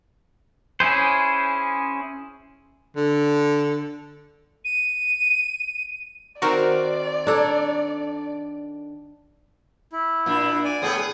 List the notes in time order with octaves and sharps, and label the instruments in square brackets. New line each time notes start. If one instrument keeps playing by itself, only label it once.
[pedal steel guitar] C#4 E4 G#4 C5
[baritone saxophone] D3
[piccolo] D#7
[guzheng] D#3 C4 [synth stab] F#4 A#4 [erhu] D5
[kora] D4 A4 [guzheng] C#5 A#5
[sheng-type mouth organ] E4
[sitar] A#2 D4
[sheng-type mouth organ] D5 G#5
[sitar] A2 B3 G#4 [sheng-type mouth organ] D#6
[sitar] G#4